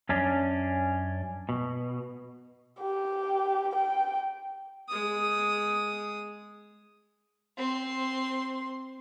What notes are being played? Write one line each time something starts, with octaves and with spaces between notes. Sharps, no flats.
F#2 C#4 D4
B2
G4
G5
G#3 D#6
C4 C6